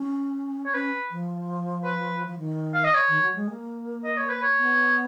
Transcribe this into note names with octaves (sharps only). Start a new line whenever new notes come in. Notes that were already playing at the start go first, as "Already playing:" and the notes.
Already playing: C#4
C#5
C#4 B4
F3
B4
F3
D#3
F5
D#5
C#5
D#3
F#3
G#3
A#3
D#5
C#5
B4
C#5
B3